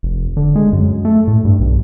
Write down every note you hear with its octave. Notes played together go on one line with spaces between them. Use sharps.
F1
D3
G#3
F#2
A3
A2
G2
B1